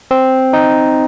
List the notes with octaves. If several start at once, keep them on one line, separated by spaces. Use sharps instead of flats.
C4
D#4